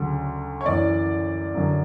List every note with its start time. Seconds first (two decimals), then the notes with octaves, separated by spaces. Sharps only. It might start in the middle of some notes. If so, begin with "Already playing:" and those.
Already playing: D2 C#3 F#3
0.61 C#5
0.66 F#2 E3 D5
1.55 F#2 D3 F#3